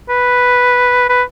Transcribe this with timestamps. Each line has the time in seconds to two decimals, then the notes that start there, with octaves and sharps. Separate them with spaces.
0.09 B4
1.09 B4